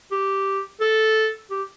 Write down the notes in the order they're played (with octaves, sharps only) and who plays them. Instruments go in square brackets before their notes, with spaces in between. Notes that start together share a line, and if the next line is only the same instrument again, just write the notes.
[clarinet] G4
A4
G4